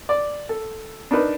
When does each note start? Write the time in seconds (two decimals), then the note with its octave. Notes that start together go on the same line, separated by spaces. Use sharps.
0.09 D5
0.49 A4
1.11 D4 D#4 A#4 B4